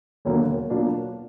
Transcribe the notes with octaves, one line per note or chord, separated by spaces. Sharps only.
E1 D#2 D3 F#3 A#3
B2 F#3 A#3 D4 F4